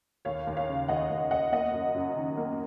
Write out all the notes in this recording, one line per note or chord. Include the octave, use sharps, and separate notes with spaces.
D#2 C#5 F5
D#2
C#5 F5
C#3
D#2 D#5 F#5
D#2
D#2 D#5 F#5
A#3 D#5 F#5
F#2
F#2
D#3
A#3